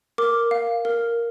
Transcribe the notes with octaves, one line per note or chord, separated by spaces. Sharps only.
A#4 D6
F5
A#4